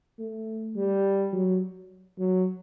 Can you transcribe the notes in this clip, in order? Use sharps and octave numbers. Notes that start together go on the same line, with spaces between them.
A3
G3
F#3
F#3